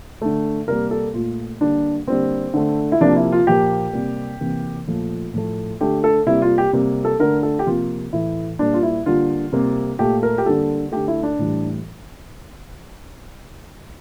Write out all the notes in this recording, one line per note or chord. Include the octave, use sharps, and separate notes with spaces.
D3 A3
C3 G3 A#3 A#4
A4
A#2 A3 F4
D3 G3 A#3 D4
D3 G3 A#3 C4
D3 A3
E4
C3 F3 A#3 D4
E4
F4
A#2 F3 A#3 G4
C3 G3 A#3
C3 E3 A#3
A#2 F3 A3
A2 F3 A3
D3 A3 G4
A4
C3 G3 A#3 E4
F4
G4
C3 G3 A#3
A4
D3 A3 A#4
A4
G4
C3 F3 A#3 F4
A2 E3 A3 E4
A#2 G3 A#3 D4
F4
E4
D3 G3 A#3 F4
C3 G3 A#3
A#2 A3 G4
A#4
G4
D3 G3 A#3 A4
D3 A3 G4
E4
D4
A2 E3 G3